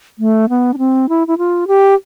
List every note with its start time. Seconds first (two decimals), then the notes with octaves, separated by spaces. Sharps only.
0.19 A3
0.49 B3
0.74 D4
0.78 C4
1.09 E4
1.27 E4
1.38 F4
1.68 G4